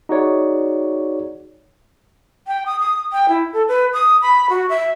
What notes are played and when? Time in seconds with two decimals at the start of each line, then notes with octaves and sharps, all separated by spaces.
0.09 D#4 F#4 G#4 C#5 D5
2.47 G5
2.66 D#6
2.80 D#6
3.13 G5
3.29 E4
3.53 A4
3.68 B4
3.93 D#6
4.21 B5
4.50 F#4
4.69 E5